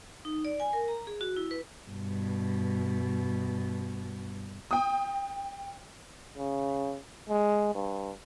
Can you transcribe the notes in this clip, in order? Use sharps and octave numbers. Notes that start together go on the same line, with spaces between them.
D#4
D5
G#5
A#4
A#5
G#4
F#4
E4
B4
G2 B2
G5 D#6
C#3
G#3
G2